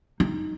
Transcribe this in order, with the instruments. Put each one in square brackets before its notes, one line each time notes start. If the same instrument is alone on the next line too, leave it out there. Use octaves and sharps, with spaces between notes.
[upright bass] D#4